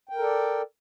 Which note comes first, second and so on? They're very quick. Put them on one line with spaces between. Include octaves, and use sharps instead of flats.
G5 A#4 A4 D5